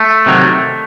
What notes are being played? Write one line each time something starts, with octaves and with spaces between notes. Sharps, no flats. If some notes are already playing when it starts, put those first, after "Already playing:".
Already playing: A3
C3 D#3 F#3